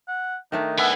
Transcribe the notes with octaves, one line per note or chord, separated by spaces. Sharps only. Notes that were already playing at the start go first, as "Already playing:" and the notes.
F#5
D#3 A3 D4 D#4
G3 B3 E5 F#5 G#5